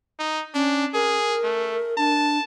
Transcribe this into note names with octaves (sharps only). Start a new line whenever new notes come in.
D#4
C#4 D4
G#4 A#4
A3
D4 A5